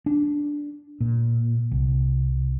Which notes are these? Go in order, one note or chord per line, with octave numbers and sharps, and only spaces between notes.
D4
A#2
C2